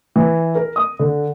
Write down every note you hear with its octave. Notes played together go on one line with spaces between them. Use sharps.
E3
A#4
D#6
D3